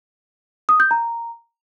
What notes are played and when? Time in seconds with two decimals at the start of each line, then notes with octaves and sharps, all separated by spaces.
0.69 D#6
0.80 G6
0.91 A#5